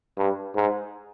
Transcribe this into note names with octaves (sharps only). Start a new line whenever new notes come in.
G2
G#2